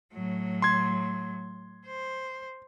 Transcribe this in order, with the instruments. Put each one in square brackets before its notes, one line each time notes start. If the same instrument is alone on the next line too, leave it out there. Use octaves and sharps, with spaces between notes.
[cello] A2 F#3
[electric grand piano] C6 G#6
[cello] C5